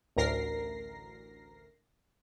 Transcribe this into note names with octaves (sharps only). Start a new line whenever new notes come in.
A1 D2 A#4 A#6 C7